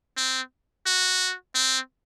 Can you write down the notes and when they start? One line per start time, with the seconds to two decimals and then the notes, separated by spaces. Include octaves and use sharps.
0.17 C4
0.86 F#4
1.55 C4